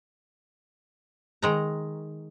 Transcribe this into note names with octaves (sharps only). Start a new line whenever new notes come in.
D#3 G#3 A#5